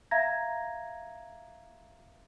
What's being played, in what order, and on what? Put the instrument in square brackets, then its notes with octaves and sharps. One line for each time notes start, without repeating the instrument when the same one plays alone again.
[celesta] E5 F5 A#5 G#6 A#6